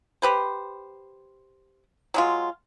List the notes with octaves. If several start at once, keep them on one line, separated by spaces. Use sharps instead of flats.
G4 B4 C5
F#3 G#3 F4